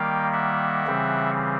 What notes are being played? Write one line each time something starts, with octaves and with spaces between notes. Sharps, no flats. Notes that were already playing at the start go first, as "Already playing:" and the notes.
Already playing: D#3 G3 A#3 F5 G5
E5 F#5
C#3 E3 G3 C4